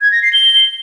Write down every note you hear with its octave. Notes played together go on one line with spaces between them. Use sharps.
G#6
A#6
C7
G7